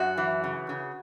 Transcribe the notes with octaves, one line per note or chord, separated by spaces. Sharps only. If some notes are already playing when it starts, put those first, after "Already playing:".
Already playing: F#2 F#4
E3
C#3
C#3